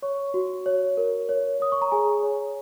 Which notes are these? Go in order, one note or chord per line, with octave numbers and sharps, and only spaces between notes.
C#5 C#6
F#4
C#5
A#4
C#5
C#5 D#6
C#6
A#5
G#4 G#5
C#5